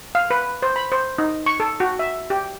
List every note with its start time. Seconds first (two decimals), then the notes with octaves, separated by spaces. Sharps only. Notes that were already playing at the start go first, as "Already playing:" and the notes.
0.15 F5
0.31 B4
0.62 C5
0.76 B5
0.92 C5
1.18 D#4
1.46 C#6
1.60 A4
1.80 F#4
1.99 E5
2.30 G4